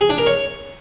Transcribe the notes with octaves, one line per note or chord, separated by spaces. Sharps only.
G#4
D4
A#4
C#5